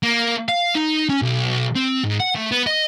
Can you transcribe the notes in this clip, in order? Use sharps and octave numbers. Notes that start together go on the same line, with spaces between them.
A#3
F5
D#4
C#4
B1
C4
G#2
F#5
A3
B3
D#5